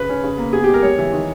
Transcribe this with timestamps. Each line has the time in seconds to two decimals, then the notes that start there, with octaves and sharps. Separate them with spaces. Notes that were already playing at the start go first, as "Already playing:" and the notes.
Already playing: C#3 B4
0.09 C#4
0.24 C#3
0.38 A#3
0.53 B3 G#4
0.64 G4
0.69 G#3 A#4
0.83 G3 C#5
0.98 E3
1.12 D#3